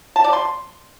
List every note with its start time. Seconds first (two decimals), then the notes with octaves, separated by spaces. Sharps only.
0.16 A5
0.24 D5
0.33 C6